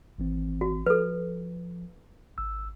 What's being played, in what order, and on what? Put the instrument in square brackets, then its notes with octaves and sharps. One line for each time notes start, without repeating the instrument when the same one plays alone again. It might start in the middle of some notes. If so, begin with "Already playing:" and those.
[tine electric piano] G#1 E3 C4
[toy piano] F#4
[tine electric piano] F3 [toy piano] A4 B4
[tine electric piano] G#1 E6